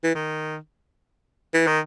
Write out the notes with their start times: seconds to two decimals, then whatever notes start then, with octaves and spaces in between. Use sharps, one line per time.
0.04 E3
0.15 D#3
1.54 E3
1.67 D#3